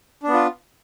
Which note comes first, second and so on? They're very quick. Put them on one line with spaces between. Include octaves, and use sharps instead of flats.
D4 B3 F4